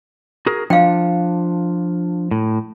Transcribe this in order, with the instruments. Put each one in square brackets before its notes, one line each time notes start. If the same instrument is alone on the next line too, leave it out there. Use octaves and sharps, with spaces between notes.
[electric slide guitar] F#4 G#4 A#4
[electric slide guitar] F3 D4 F4 [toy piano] F5 G5
[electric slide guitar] A2